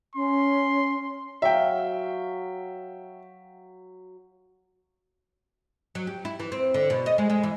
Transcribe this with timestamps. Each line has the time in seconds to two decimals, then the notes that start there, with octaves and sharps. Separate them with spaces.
0.16 C#4 C6
1.42 F#3 E5 F5 G5
5.95 F#3
6.07 G4
6.25 E4
6.40 E3
6.52 C4
6.74 D3
6.90 B2
7.06 D#5
7.18 G#3
7.30 G#3
7.44 E3